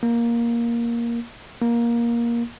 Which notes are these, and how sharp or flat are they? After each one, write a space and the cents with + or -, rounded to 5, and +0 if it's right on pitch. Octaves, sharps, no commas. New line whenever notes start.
A#3 +10
A#3 +15